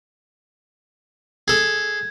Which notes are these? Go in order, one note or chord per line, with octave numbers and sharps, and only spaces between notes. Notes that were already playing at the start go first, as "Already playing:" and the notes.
G#4 A4 G#6